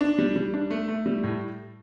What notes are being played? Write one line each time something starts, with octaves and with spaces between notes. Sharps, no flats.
D4
G3
G3
D4
A3
A3
G3
A2